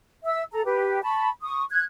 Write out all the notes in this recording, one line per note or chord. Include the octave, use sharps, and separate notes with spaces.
E5 E6
A4 A#5
G4 B4
A5 B5 C#6
C#6 D#6
F#6 G#6